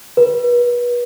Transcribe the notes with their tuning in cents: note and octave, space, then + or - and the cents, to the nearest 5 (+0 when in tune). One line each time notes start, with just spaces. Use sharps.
B4 -35